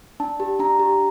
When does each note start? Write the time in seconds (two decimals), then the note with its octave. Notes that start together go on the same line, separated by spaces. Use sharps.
0.20 D4 A5
0.40 G4
0.59 D4 A#5
0.80 G4